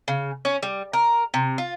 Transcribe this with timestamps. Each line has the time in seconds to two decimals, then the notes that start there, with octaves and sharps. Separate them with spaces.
0.08 C#3
0.45 C#4
0.63 G3
0.93 A#4
1.34 C3
1.58 F4